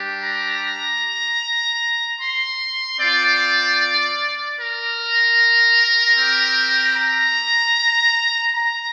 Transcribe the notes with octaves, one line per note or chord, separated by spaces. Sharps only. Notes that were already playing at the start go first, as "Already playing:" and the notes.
Already playing: G3 D4 G4
A#5
C6
C4 F4 D5
A#4
C4 G4
A#5
A#5